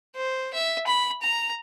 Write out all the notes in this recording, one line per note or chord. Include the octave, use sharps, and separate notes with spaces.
C5
E5
B5
A#5